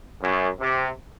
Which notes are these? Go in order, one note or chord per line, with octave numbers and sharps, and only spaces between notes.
F#2
C3